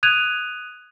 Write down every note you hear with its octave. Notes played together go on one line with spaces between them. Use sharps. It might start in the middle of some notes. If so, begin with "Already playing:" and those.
D#6 F#6 G#6 D#7 F7